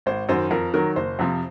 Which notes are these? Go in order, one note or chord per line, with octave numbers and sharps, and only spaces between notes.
G#1 C5
F#2 D#3 C5
F2 A#4
D#3 F#3 A#4
F#1 C5
F2 C3 F3